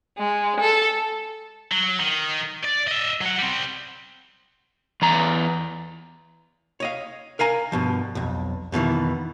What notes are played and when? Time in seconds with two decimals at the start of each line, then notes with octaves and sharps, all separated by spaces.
0.19 G#3
0.60 A4
1.72 F#3
2.00 D#3
2.65 D5
2.88 D#5 E5
3.21 F#3 F#5
3.39 G3 C4
5.02 E2 A#5
6.80 C#5 D#5 F5
7.39 A#4 F5 G#5 A#5
7.72 G2 B2 F3
8.15 B1 F2
8.72 F2 B2 D#3 E3